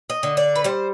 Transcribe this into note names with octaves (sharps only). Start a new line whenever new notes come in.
D#5
D3
D5
B4
G3 C5